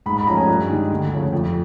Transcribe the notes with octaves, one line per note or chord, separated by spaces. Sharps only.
G#2 B5
B5
F3 A3 C#4 A#5
G#5
G2
D#3 G#3
D2
C#3 F3 A3
F2